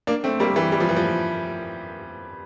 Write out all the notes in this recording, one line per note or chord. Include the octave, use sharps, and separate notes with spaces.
A#3 D4
A3 C4
G3 A#3
E3 G3
G3
F3
E3
F3